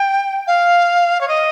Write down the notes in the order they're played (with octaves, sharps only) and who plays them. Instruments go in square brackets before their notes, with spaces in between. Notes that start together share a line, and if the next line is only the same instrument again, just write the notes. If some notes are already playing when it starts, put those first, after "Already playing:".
Already playing: [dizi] G5
F5
C#5
D#5